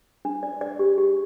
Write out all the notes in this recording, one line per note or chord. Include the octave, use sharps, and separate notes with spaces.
D4
D5
D5
G4
G4